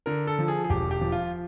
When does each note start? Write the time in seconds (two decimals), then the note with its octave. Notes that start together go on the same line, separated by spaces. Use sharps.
0.06 D3 A#4
0.27 A4
0.39 F3
0.48 G#4
0.64 G#4
0.69 E1 G4
0.91 G4
1.01 F3
1.12 F4